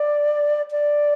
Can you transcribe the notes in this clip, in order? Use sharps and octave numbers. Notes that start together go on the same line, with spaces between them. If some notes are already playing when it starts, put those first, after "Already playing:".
Already playing: D5
D5